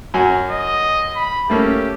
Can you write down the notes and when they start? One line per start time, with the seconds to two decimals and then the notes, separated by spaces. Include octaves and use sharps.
0.14 F#2 F#4 G#5
0.50 D#5
1.15 B5
1.50 A3 A#3 C#4 G4